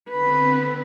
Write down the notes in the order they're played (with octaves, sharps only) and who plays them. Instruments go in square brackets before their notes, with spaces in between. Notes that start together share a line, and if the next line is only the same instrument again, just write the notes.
[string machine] D3 B3 C4 [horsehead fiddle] B4